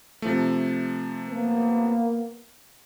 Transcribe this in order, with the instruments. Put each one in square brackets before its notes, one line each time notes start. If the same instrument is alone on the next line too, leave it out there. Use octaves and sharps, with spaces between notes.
[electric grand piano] C3 F3 A3
[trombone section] A#3 B3